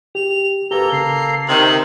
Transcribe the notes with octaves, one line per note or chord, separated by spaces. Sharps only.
G4 F7
A#3 G4 A4 B4 A#5 G7
C#3 C7
C3 D#3 C4 F#7